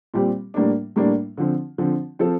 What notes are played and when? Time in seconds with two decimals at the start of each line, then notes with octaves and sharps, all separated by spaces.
0.14 A#2 G3 C4 G4
0.54 A2 G3 A#3 D4
0.96 A2 G3 A#3 D4
1.37 D3 F3 C4
1.78 D3 F3 C4
2.19 F3 C4 F4 A4